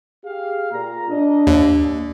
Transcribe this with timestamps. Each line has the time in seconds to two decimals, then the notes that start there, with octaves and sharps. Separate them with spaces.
0.24 G4 G#4 F5
0.72 A#2 A#5
1.10 D4 D#5
1.47 D#2